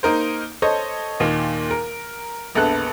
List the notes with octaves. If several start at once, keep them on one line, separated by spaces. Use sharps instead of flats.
A#3 D#4 A#4 C5
A4 C5 C#5 D#5
D#2 A#2 D#3
A#4
E1 A#1 B3 A4 F#6